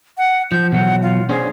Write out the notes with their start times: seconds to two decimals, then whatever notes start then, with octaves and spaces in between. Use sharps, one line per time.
0.18 F#5
0.52 F3 G6
0.72 B2 E3 F#3 F#5
1.03 F4
1.29 C#4 D4 G#4 C5